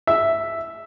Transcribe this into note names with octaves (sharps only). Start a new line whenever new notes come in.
E5